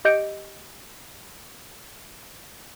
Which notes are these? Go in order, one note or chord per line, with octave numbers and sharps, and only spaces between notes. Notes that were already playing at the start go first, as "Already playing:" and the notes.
G4 D#5 G6 C#7 D7